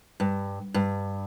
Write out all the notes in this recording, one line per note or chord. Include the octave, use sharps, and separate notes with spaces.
G2
G2